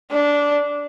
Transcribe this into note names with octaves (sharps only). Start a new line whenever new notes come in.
D4